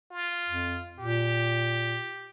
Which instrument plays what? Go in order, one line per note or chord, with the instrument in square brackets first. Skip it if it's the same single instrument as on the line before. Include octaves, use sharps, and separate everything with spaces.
[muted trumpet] F4
[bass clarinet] F2
[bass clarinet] A#2 [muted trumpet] G4